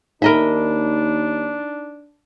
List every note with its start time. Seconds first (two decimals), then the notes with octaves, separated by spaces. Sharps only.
0.22 D#2 D4 D#4 A#4 D#5 E5 A#5 B5